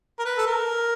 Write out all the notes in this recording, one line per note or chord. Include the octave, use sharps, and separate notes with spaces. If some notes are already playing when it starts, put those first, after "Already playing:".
A#4
B4
A4
A#4